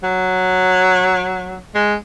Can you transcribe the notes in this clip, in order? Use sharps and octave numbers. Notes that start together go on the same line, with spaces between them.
F#3
G#3